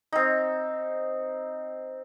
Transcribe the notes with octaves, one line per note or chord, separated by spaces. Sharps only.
C4 D#4